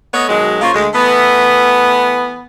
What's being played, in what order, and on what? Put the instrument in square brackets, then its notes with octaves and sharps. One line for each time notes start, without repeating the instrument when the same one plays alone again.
[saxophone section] A3 B3 C#5 D#5
B2 D#3 F#3 G#3
C#3 A#3 F4 C5 C#5
D2 G#3
E3 A3 B3